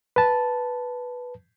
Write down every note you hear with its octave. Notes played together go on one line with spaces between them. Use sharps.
B4 A5